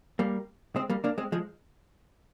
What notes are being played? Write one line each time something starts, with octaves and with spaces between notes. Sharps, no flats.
G3 A#3
G#3 C4
G3 A#3
A#3 D4
G#3 C4
F3 G#3